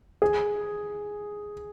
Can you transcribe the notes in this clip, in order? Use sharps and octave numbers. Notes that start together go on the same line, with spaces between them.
G#4